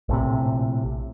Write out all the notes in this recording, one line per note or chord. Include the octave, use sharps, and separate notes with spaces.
A#1 A2 C3